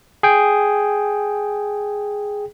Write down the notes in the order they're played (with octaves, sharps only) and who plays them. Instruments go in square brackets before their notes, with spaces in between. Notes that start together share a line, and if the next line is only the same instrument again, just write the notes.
[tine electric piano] G#4 G5